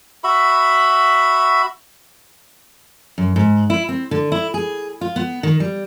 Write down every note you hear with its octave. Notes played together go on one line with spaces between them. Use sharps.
F#4 E5 B5
F#2
G#2
E4
C4
D3
E4
G#4
F4
B3
D#3
G3